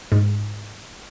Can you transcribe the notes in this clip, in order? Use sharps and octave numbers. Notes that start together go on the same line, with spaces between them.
G#2